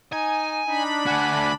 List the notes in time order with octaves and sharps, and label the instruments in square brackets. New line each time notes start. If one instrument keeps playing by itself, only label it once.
[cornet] D#4 [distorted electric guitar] G#5
[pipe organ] D4 B5 [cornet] D#4
[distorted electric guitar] D2 F#4 [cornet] G#5